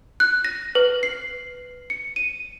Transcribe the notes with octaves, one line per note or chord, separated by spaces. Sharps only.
F#6
A#6
B4
C7
C#7
D#7